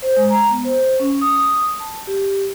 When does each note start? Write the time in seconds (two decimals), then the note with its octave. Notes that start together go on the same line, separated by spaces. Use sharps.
0.02 C5
0.16 G#3
0.30 A#5
0.50 B3
0.65 C5
1.00 C#4
1.21 D#6
1.80 A5
2.07 G4